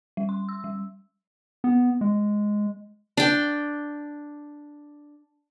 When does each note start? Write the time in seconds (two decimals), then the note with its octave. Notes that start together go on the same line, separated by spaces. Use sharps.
0.17 G3
0.29 C6
0.49 E6
0.64 G3
1.64 B3
2.01 G#3
3.17 D4 G5